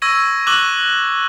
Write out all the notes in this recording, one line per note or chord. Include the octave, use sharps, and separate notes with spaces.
C#6 E6 G#6 A#6 D#7
C#6 D6 E6 F#6 F#7 G7